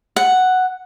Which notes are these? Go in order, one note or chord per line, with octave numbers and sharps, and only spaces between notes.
F#5